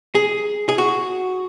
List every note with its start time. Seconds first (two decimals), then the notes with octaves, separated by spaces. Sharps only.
0.15 G#4
0.69 G#4
0.78 F#4